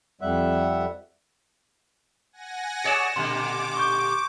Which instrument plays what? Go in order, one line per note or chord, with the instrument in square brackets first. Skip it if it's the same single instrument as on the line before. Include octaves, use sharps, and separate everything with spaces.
[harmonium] F2 G3 E5 F#5
[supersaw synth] F#5 G#5 A#6
[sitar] G#4 C#5 D5 [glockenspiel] C#7 E7
[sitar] A#2 D3 G3 [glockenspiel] C6 [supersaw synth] D6
[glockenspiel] C#6 G6